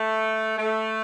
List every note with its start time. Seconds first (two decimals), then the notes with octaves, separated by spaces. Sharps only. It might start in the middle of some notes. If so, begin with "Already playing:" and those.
Already playing: A3
0.58 A3